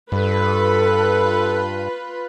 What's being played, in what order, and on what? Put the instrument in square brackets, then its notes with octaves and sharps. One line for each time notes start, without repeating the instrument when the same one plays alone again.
[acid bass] G2 [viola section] F4 B4 [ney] A4